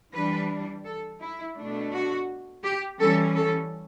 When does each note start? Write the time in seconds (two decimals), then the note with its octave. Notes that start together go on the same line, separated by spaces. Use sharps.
0.13 E3 G3 D4 B4
0.85 A4
1.20 E4
1.56 B2 A3 D4
1.92 F#4
2.64 G4
3.00 E3 G3 C#4 A4
3.35 A4